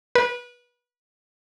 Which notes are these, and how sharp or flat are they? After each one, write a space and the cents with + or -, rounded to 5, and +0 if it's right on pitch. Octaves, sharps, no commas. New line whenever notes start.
B4 -25